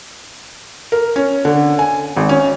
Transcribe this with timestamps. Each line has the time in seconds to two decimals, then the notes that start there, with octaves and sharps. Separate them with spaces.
0.92 A#4
1.16 C#4
1.45 D3
1.79 G#5
2.17 G#1
2.29 C#4